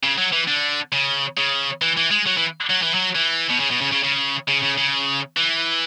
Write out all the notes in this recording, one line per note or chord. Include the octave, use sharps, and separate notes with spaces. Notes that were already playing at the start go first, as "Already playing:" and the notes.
C#3
F#3
E3
D3
C#3
C#3
E3
E3
G#3
F#3
E3
F#3
E3
F#3
E3
B2
C#3
B2
C#3
C#3
C#3
C#3
C#3
C#3
E3